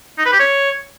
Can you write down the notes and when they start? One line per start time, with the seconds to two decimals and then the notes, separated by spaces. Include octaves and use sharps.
0.18 D#4
0.25 B4
0.33 G4
0.40 C#5